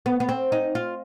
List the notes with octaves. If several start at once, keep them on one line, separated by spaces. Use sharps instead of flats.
B3
B3
C4
D#4
F4